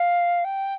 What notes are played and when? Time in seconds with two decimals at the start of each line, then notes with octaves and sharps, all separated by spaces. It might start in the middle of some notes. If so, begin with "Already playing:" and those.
Already playing: F5
0.44 G5